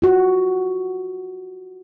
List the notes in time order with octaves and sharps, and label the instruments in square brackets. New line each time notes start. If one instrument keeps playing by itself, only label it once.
[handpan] F4 F#4